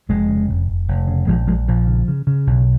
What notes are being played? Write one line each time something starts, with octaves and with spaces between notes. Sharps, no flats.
F1 F3 G#3
C#3
F1
F1
F1
C#3
A#1 F3 G#3
A#1 F3 G#3
A#1 F3
C#3
C#3
C#3
B1